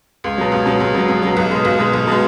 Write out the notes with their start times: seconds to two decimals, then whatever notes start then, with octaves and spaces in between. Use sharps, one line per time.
0.24 C#2
0.38 B2 F#3
0.52 C#2
0.66 B2 F#3
0.80 C#2
0.94 B2 F#3
1.08 C#2
1.22 B2 F#3
1.37 B1
1.51 B2 G#3
1.65 B1
1.79 B2 G#3
1.93 B1
2.07 B2 G#3